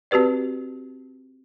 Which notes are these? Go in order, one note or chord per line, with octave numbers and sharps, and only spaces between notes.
C4 F#4 G4 B4 D5